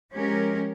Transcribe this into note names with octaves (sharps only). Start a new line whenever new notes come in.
F3 G#3 C#4 G4 A#4